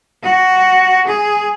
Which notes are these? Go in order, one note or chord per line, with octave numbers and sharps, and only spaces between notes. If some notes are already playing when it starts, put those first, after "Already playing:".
F#4
G#4